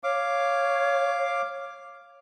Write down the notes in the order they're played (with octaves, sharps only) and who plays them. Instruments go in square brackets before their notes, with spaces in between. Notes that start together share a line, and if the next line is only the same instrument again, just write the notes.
[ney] C#5 [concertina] F5 D6